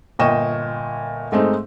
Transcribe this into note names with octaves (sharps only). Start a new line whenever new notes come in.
G1 A#2 D#5 G5 C#6 E7
G#2 G#3 A3 C4 D#4